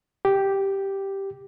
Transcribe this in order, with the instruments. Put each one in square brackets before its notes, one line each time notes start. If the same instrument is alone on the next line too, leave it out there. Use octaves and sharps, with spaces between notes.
[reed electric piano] G4